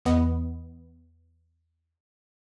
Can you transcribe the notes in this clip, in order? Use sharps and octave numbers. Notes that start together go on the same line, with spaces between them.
E2 B3 D#5